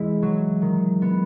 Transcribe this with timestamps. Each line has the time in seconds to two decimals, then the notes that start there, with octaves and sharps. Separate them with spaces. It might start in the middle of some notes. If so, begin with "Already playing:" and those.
Already playing: E3 G#3 E4
0.22 F#3
0.62 D#3
1.02 B3